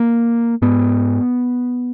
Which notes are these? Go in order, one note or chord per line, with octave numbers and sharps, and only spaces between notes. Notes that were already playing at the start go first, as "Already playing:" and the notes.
Already playing: A#3
G#2 B3